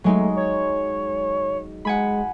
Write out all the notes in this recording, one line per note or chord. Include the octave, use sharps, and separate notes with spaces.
F#3 G#3 A3 D#4
C#5
G#3 F#5 G#5 B5